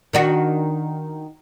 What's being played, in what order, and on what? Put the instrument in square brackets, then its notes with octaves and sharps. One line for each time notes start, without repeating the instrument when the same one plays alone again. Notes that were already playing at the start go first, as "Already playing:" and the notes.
[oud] D#3 D4 F#4